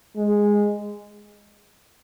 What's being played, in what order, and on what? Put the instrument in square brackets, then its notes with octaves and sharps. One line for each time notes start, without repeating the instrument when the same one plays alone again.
[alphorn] G#3